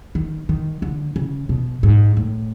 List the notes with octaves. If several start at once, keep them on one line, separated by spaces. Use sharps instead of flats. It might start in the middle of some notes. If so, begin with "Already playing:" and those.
D#3
D#3
D3
C#3
B2
G#2
A2